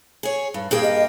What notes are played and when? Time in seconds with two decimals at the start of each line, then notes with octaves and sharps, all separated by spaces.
0.23 G#4 C#5
0.54 G2
0.71 G2 A#3 G4 G#4
0.83 D#5